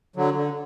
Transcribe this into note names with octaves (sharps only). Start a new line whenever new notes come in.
D3 F#3
D3